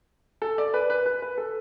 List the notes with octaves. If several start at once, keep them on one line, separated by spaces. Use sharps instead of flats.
A4
D5
B4
B4
B4
B4
A4